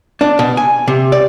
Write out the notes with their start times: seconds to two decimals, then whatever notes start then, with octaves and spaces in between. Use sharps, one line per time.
0.21 D4
0.39 B2
0.57 G#5
0.88 C3
1.12 D5